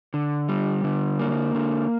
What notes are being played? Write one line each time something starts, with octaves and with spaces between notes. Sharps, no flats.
D3
G3
D3
A#3
D3